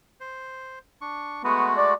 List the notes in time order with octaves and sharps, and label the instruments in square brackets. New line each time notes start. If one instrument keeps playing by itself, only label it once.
[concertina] C5
D4 C#6
[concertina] G#3 A3 F#4 [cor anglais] B3
[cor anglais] D5